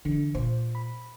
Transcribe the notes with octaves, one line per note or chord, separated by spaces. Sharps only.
D3 E3
A#2 C5
B5